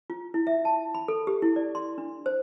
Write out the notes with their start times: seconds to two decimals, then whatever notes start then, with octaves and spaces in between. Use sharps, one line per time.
0.10 F4
0.34 E4
0.47 E5
0.65 A5
0.94 B5
1.08 A4
1.27 G4
1.42 E4
1.56 D5
1.75 C6
1.98 D4
2.26 C5